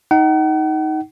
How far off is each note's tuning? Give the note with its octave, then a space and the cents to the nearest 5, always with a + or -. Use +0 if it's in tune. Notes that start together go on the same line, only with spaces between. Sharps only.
D#4 +10 F#5 +40